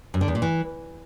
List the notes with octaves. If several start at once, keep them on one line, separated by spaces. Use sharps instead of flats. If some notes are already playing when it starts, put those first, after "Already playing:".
F#2
D3
E2
A#2
E3